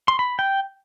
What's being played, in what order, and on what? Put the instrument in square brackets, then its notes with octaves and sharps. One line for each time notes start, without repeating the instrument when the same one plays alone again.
[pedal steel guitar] C6
B5
G5